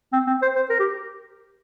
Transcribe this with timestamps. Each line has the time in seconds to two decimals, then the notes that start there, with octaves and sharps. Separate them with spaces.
0.13 C4
0.27 C4
0.42 C5
0.56 C5
0.70 A#4
0.79 G4